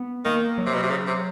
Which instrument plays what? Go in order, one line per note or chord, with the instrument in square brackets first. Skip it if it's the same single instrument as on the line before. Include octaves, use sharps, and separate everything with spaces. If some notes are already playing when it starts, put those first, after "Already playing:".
Already playing: [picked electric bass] B3
[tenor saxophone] D#3 [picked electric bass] A#3
[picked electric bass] F#3
[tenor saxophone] C3
B2
C3
C#3
C3